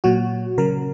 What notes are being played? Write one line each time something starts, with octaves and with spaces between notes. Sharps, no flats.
A#2 F#3 F#4
C#3 F#3 A#4